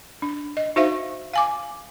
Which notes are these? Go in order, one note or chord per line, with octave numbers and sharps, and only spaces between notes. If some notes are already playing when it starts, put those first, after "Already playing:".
D4
D#5
D#4 F#4 C5 E5 F5
F5 G#5 D6